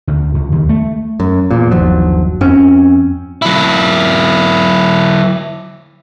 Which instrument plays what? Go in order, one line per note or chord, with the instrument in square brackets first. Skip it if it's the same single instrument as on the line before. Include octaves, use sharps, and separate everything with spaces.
[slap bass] D2
C#2
D#2
A3
[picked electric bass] F#2
E2 A#2
G1 D#2 F3 F#3
F2 C4 C#4
[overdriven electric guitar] F#3 E4